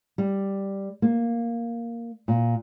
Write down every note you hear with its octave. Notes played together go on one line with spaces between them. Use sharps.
G3
A#3
A#2